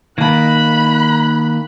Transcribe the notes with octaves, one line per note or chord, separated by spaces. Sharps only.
D#3 A#3 B5 F#6